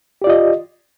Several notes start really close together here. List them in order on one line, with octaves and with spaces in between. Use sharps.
G4 D5 F4 D#5